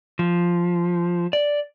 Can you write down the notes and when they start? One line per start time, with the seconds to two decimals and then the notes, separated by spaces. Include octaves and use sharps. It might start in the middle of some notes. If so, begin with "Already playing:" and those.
0.19 F3
1.33 D5